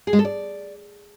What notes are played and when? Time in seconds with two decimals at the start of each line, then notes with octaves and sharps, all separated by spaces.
0.07 G#4
0.13 G#3
0.19 A4
0.25 D5